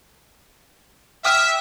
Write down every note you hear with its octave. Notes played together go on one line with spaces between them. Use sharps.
E5 G5 D#6 F6